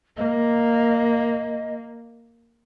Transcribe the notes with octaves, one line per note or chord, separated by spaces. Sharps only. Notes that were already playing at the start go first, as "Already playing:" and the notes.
A#3 D#5